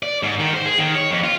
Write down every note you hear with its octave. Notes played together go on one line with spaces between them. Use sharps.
D5
G#2
D#3
C5
G#4
D#3
C#5
F2
F4